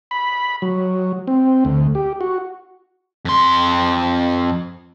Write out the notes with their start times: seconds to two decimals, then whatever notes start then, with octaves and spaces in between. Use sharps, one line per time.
0.11 B5
0.62 F#3
1.27 C4
1.65 D2
1.95 G4
2.21 F#4
3.25 F2 C6